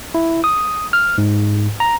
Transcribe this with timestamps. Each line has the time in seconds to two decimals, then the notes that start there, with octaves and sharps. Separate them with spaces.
0.15 E4
0.44 D#6
0.93 F6
1.18 G#2
1.80 A#5